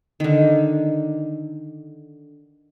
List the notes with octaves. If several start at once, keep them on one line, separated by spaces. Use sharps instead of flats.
D3 D#3